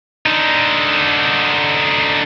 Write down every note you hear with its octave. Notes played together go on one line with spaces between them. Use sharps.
D3 D#4